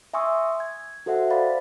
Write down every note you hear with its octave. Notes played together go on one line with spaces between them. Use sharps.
E5 G#5 C6 C#6 D#6 E6
G#6
F#4 A4 C5 E5 F#5
C5 D5 F5 B5 A6